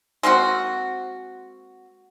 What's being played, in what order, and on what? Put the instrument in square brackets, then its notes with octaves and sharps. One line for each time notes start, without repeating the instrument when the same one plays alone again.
[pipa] G#3 A#3 C4 F#4